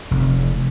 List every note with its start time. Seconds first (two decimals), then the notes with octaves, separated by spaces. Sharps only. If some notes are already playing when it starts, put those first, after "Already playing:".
0.11 F1